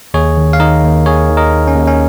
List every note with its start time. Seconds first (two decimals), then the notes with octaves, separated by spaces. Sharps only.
0.14 D#2 G#4 C#5
0.37 D#3
0.53 F5
0.60 D#3 A#4 D#5
0.83 D#2
1.06 D#2 G#4 C#5
1.30 D#3
1.37 A#4 D#5
1.53 D#3
1.68 C#4
1.75 D#2
1.87 C#4